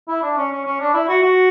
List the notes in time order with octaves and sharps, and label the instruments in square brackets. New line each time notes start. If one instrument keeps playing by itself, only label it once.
[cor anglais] E4
D4
C#4
C#4
C#4
D4
E4
F#4
F#4